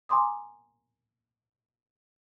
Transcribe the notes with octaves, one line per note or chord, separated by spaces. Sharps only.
G#5 A#5 C6 D6 D#6